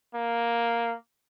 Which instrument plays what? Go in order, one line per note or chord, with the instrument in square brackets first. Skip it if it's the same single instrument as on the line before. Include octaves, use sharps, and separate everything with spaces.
[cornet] A#3